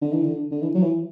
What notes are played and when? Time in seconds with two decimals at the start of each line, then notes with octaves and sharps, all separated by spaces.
0.02 D3
0.13 E3
0.24 D3
0.51 D3
0.62 E3
0.74 F#3
0.83 E3